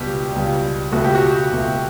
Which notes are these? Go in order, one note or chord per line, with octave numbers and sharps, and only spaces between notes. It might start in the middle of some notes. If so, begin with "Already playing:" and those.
Already playing: C#2 B2 G3 G4
C#2 B2 G3
C#2 B2 A3 F#4
G4
F#4
C#2 B2 A3